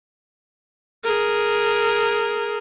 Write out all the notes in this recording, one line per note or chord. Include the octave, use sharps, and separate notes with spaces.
G#4 A#4